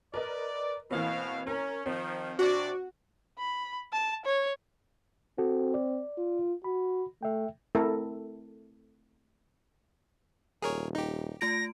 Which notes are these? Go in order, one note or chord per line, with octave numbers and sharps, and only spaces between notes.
A#4 B4 D5 D#5
B2 E3 A#3 C4 F5
C#4 A#4 A#5
D#3 F3 C4
C3 D4 F#4 D5
B5
A5
C#5
C4 F#4 A4
D5
F4
F#4 B5
A3 E5 G5
A3 C4 E4 A4 A#4
D#1 G#4 A#4 C#5
D#4 G4
A3 F4 A#6 D7